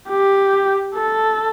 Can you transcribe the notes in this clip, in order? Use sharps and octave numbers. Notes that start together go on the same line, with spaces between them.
G4
A4